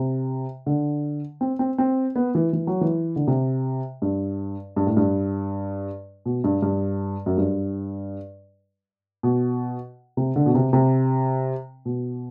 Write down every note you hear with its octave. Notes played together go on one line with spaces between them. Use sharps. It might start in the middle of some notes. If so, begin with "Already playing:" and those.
Already playing: C3
D3
C4
C4
C4
B3
E3
E3
F#3
E3
D3
C3
G2
G2
A2
G2
B2
G2
G2
F#2
G2
B2
C3
D3
B2
C3
C3
B2